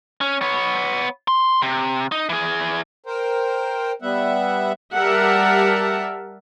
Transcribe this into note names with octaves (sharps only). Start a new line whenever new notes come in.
C#4
B3 C#5
C6
C3
D#4
E3 G#4
A#4 C5 G5
G3 B3 E5 F#5
G3 G4 A#4 E5 F#5 A5